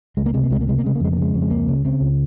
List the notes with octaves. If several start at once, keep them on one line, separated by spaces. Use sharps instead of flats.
C#2 G#3
A#3
C3 G#3
A#3
C#2 G#3
A#3
C3 G#3
A#3
C#3 G#3
A#3
F2 G#3
A#3
C#3 G#3
F2
G#3
C#2 A#3
C#3
C#3 C4
C#2